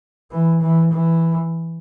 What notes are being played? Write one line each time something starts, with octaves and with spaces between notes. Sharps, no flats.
E3
E3
E3